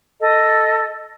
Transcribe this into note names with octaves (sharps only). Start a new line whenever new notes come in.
A4 D#5